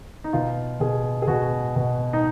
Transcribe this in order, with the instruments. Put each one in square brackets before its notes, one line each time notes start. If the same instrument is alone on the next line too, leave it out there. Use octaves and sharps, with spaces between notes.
[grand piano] D#4
B2 F4
B2 G#4
G#4
B2 F#4
B2
D#4